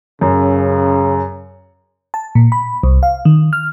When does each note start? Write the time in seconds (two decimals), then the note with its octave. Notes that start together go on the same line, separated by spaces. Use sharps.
0.21 F#2 C#3
2.14 A5
2.35 A#2
2.52 B5
2.83 C2
3.03 F5
3.25 D#3
3.53 F6